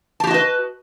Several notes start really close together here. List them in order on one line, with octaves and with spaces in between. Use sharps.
A5 G4 F#4 D#5 B4